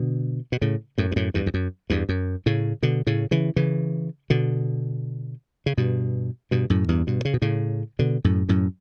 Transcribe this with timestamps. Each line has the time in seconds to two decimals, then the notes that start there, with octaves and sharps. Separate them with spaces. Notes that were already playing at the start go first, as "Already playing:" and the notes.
Already playing: B2 D3
0.52 B2
0.61 A2 C#3
0.98 F#2 A2
1.12 G2
1.16 F#2 A2
1.34 E2 G2
1.46 E2
1.54 F#2
1.90 E2 G2
2.09 F#2
2.46 A2 C#3
2.83 B2 D3
3.07 A2 C#3
3.31 C#3 E3
3.56 C#3 E3
4.30 B2 D3
5.66 C#3
5.77 G2 B2
6.51 G2 B2
6.70 F#2 A2
6.89 E2 G2
7.07 G2 B2
7.25 C#3
7.34 B2
7.42 A2 C#3
7.99 B2 D3
8.24 F#2 A2
8.49 F#2 A2